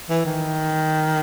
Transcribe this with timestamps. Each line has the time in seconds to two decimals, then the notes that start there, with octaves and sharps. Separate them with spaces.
0.10 E3
0.26 D#3